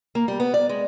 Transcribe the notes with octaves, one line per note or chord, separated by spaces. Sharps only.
A#3
G3
B3
D5
G#3